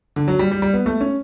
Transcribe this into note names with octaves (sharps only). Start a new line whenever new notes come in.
D3
F#3
G3
G3
G3
B3
A3
C#4